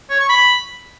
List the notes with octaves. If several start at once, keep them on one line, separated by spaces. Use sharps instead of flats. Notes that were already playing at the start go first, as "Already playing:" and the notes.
C#5
C#6
B5